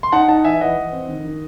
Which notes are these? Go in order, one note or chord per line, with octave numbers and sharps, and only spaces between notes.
C6
D#4 F#5 A5
D#4 F#5 A5
E3 E5 G#5
E3 D#5 F#5
E3
C4
D#3
D#3